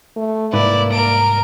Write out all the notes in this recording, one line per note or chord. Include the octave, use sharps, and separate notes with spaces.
A3
C2 G#2 A#3 E4 B4 D5
A#4 D7